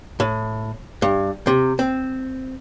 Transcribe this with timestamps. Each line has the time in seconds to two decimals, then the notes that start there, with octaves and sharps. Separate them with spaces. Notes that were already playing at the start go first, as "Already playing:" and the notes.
0.20 A2
1.02 G2
1.47 C3
1.79 C4